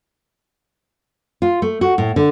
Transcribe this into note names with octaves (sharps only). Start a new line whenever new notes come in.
F4
A3
F#4
A2
D3